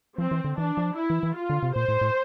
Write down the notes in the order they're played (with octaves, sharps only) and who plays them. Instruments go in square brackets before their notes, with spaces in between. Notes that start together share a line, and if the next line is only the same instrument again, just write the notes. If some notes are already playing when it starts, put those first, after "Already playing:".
[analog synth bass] F3 [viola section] C4
[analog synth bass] E3
D3
[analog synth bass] E3 [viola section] D4
[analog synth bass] F3
[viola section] E4
[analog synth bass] E3
E3
[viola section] F4
[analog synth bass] D3
C3
[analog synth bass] A#2 [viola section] C5
[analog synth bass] A2
A2